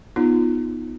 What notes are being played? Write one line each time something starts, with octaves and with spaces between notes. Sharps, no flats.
B3 D#4 F4